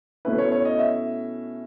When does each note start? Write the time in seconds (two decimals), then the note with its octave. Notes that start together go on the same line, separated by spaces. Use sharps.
0.25 B2 A3 C#4 E4 B4
0.38 C#5
0.52 C#5
0.65 D#5
0.79 E5